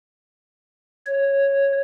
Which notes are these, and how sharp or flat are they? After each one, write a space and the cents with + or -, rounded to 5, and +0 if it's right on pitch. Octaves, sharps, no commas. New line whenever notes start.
C#5 -5